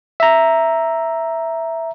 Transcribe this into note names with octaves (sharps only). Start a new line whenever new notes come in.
E5 A#5